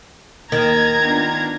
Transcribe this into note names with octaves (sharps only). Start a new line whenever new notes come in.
D#2 D#3 D#5 A#5 G#6
B3 D4 F4